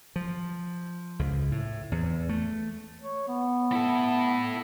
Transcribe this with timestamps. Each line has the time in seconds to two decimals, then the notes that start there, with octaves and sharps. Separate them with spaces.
0.16 F3
1.19 C#2
1.52 A2
1.92 E2
2.29 A3
3.01 C#5
3.28 B3
3.72 E4 A4